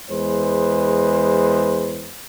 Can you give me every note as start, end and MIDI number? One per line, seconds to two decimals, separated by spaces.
0.10 2.14 40
0.10 2.14 56
0.10 2.14 71
0.10 2.14 72